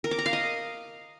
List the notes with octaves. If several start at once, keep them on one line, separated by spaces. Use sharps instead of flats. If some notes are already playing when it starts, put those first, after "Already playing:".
A#4
D6
A#5
F5
D#5